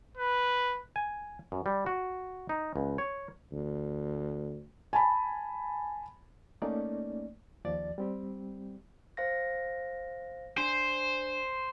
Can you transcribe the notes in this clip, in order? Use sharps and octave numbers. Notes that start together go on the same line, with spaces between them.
B4
G#5
F#2
G3
F#4
D#4
C#2
C#5
D2
G#5 A5 B5
A3 A#3 C#4 D#4 D5
D#2 F3 D5 A6
G3 C4 G4
C5 F5 A#6
D4 C5